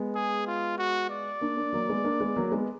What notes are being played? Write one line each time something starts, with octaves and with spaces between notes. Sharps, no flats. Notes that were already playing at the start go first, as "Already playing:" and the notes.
Already playing: G#3 B3
G#4
F4
F#4
D5
A#3 D4
A#3 D4
F#3 A#3
G#3 B3
A#3 D4
G#3 B3
F#3 A#3
G#3 B3